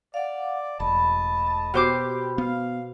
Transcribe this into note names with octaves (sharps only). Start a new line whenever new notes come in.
D5 F5 F#5
E1 A2 D#5 A5 B5
B2 G4 C5 D6
B3 F5